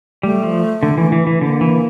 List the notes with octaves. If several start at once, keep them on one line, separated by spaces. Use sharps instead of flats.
G3 A3
F3
D3
E3
E3
E3
D3 A#3
E3